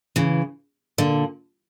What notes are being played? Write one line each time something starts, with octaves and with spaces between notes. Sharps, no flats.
C#3 E3
A#2 D3